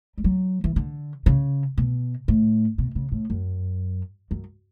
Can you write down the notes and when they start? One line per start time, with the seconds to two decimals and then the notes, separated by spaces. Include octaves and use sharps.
0.18 G3
0.24 F#3
0.64 E3
0.76 D3
1.26 C#3
1.78 B2
2.28 A2
2.78 B2
2.95 C#3
3.12 A2
3.30 F#2
4.31 F#2